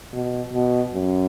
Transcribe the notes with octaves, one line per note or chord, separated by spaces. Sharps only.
B2
B2
F#2